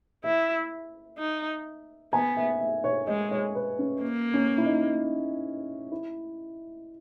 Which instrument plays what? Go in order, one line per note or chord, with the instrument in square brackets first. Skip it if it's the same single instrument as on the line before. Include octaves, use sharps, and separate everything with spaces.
[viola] E4 [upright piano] E5
[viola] D#4
[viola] B3 [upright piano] G#5
[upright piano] E5
E5
C#5
[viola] G#3 [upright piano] D#5
[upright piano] C#5
B4
C#4
[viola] A#3
[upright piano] C#4
E4
D#4
E4